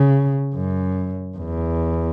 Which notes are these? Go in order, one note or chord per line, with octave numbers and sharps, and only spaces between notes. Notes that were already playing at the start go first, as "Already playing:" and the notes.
Already playing: C#3
F#2
E2